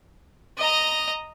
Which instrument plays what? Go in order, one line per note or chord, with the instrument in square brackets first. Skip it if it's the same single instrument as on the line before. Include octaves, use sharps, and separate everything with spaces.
[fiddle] D#5 A#5